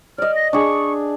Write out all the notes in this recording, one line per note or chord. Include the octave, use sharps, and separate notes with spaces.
D5 D#5 F6
A#6
D4 G#4 C#6